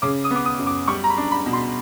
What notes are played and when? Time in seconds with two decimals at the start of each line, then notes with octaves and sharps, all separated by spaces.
0.02 C#3 D6
0.24 D#6
0.31 B3
0.36 D6
0.45 D#6
0.59 F#2
0.67 D6
0.88 G3 C#6
1.04 A#5
1.10 B5
1.17 D4
1.32 B5
1.46 B2
1.53 C6